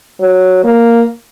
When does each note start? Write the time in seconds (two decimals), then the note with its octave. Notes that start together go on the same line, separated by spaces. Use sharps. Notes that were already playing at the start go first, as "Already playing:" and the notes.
0.20 F#3
0.64 A#3